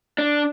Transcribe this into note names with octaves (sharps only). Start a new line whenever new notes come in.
D4